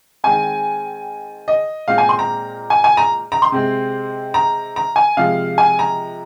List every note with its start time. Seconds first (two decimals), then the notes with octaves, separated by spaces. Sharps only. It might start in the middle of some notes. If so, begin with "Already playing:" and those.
0.24 D#3 G#3 C4 G#5
1.48 D#5
1.88 A#2 G#3 C4 F5
1.98 G#5
2.09 C6
2.19 A#5
2.70 G#5
2.84 G#5
2.97 A#5
3.32 A#5
3.42 C6
3.52 C3 G#3 C4
4.34 A#5
4.76 A#5
4.96 G#5
5.17 C3 F3 G#3 F5
5.58 G#5
5.79 A#5